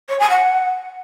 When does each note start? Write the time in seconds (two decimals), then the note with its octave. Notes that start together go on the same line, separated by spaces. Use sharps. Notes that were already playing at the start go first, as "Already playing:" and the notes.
0.09 C#5
0.19 G#5
0.30 F#5